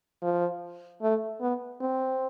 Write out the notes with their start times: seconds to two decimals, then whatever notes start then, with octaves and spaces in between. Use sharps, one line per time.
0.22 F3
1.02 A3
1.41 B3
1.81 C4